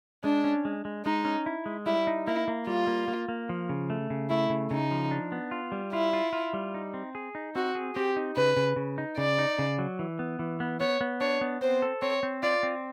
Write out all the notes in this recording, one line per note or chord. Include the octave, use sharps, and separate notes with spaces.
G#3 D4
C#4
G#3
G#3
G#3 D#4
C#4
E4
G#3
G3 E4
D#4
A#3 E4
A#3
G3 F4
A#3
A#3
A#3
F3
C#3
A3
C#3
A3 E4
C#3
C#3 D#4
F3
D4
B3
F4
G3
E4 F4
F4
F4
G3
D#4
C4
G#4
D#4
C4 F#4
G#4
C4 G4
D#4
C#3 B4
C#3
C#3
D#4
C#3 D5
D#4
C#3
F#3
E3
B3
E3
B3
B3 C#5
B3
D4 C#5
B3
C4 C5
A4
C4 C#5
C4
F4 D5
C4